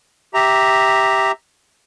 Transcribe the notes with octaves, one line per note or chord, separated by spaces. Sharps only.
G4 E5 A#5